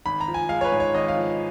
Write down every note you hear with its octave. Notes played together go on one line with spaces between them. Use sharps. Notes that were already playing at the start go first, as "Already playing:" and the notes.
G#1 B5
A#5
F3
G#5
G#3 F5
C#5
B4
G#2
C#5
G#1 D#5
F5
F3